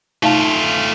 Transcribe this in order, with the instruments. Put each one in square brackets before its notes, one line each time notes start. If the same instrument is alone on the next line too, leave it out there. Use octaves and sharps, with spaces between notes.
[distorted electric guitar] A3 F4 [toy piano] D#4 F5 A5